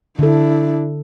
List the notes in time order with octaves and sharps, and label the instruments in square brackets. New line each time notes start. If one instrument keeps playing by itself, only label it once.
[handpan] D3 A4 [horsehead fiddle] D4 E4